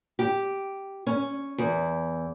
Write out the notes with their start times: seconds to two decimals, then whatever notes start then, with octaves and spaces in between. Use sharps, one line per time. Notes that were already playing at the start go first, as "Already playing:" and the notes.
0.19 G4
1.07 C#4
1.58 E2